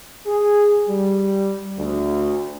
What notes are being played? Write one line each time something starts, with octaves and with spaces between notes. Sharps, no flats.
G#4
G3
D2